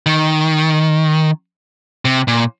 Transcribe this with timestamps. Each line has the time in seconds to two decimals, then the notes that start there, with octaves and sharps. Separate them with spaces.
0.06 D#3
2.05 C3
2.28 A#2